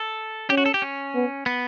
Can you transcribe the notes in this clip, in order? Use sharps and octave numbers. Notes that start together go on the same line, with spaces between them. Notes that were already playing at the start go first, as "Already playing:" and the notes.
Already playing: A4
C#4 G4
F#4
A4
G4
C#4
B3
B3